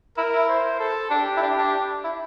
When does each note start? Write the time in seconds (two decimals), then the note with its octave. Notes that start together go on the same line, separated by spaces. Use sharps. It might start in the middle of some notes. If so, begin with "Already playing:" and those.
0.17 E4 A#4
0.33 E4
0.49 C5
0.80 A4
1.10 D4 G4
1.36 E4
1.42 D4
1.58 D4
2.04 E4